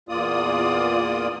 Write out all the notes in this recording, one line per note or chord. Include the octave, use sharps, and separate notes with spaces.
E2 A#2 A#3 F4 D5 D#6